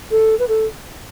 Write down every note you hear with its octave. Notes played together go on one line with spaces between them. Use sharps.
A4
B4
A4